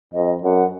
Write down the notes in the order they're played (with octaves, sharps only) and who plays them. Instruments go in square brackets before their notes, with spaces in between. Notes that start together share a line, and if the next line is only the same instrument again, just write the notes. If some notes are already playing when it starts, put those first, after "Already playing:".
[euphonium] F2 [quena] D#5
[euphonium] F#2 [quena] F#5